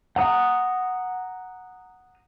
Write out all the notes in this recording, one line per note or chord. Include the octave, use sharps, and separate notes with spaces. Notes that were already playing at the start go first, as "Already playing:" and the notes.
F#5 A#5 D#6